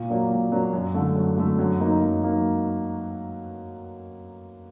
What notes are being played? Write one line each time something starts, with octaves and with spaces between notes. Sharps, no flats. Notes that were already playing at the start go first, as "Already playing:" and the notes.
Already playing: A#2
F#3 A#3 D4
A#2
F#3 A#3 D4
F#2
D3 A3
F#2
D3 A3
F#2
F#3 A#3 D#4
F#2
F#3 A#3 D#4